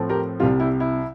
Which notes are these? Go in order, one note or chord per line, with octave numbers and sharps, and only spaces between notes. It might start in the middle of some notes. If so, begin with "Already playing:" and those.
Already playing: A2 F3 A3 C4
G4 A#4
C2 C3 G3 F4
E4 G4
E4